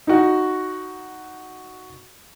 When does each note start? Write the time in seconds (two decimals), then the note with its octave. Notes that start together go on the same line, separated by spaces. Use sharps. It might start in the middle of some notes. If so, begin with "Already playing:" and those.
0.07 D#4 F#4